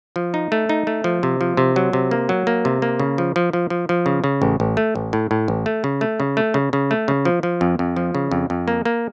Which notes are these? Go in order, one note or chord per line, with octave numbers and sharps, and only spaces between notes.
F3
D#4
A3
D#4
A3
F3
C3
F3
C3
F#3
C3
A#3
F#3
A#3
C3
A#3
C#3
F3
F3
F3
F3
F3
C#3
C#3
A1
A1
A3
A1
A2
A2
A1
A3
C#3
A3
C#3
A3
C#3
C#3
A3
C#3
F3
F3
F2
F2
F3
C#3
F2
F2
A#3
A#3